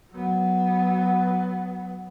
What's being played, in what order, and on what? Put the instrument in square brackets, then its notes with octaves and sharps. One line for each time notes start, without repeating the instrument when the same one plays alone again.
[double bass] F#3 B3